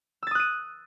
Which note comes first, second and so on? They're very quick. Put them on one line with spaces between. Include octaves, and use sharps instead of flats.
E6 A6 D#6 F#6 D#7